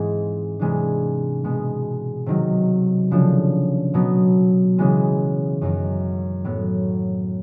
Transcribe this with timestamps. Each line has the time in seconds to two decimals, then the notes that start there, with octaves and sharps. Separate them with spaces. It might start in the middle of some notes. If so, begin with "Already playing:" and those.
Already playing: G#2 E3 G#3 C4 D#4
0.59 C3 E3 G#3 B3 D4
1.44 B2 G#3 B3
2.26 C3 D#3 F#3
3.11 C#3 F3 A3 D4
3.94 B2 F#3 B3
4.78 C#3 E3 G#3 B3
5.61 F#2 D#3 F#3
6.45 A2 F#3 B3